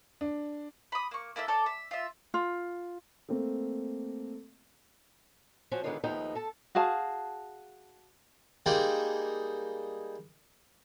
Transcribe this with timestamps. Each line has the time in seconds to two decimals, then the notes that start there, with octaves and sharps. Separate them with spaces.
0.21 D4
0.92 B5 D#6
1.11 A#3 C#6
1.36 A#3 E4 A4 E5
1.48 A4 C#5 D5 A5
1.66 E5
1.91 F4 E5
2.34 F4
3.29 A3 A#3 C4
5.72 F3 C#4 F#4 C5
5.84 D3 D#3 G#3 B3 D4 F4
6.04 D#2 F3 A3 B3 D#4 G5
6.35 A4 A5
6.75 F#4 G#4 F5 A5
8.66 G3 G#3 A#3 D#4 G4